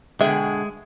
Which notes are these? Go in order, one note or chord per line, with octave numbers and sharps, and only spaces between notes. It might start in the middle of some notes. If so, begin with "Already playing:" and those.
B2 D3 G#3 G#4 E5 G5